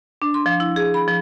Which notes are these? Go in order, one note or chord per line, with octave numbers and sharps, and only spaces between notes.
D4
C6
F3
E4
G#4
B5
F3